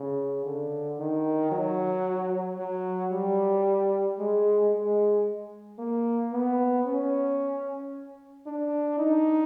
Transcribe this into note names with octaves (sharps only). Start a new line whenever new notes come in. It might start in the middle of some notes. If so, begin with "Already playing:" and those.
Already playing: C#3
D3
D#3
F#3
F#3
G3
G#3
G#3
A#3
B3
C#4
D4
D#4